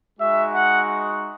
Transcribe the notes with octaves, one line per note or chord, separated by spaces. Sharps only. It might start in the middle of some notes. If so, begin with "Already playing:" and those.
G#3 D#4 F#4 E5
F#5